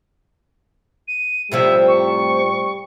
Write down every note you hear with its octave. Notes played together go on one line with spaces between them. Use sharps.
D#7
A2 C3 F3 G3 E5
C#6